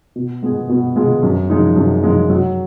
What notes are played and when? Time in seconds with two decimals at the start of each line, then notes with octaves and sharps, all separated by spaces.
0.16 B2
0.43 G#3 B3 F4 G#4
0.69 B2
0.96 G#3 B3 F4 G#4
1.22 F#2
1.50 F3 G#3 D#4
1.76 F#2
2.03 F3 G#3 D#4
2.30 F#3